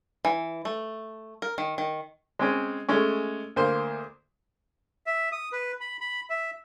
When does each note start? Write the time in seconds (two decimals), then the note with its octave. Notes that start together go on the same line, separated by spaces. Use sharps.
0.25 E3
0.65 A3
1.42 A#4
1.58 D#3
1.78 D#3
2.39 G#3 C4 C#4
2.89 G#3 A3 C#4
3.56 D2 A#3 C5
5.06 E5
5.32 D#6
5.52 B4
5.81 B5
6.01 B5
6.30 E5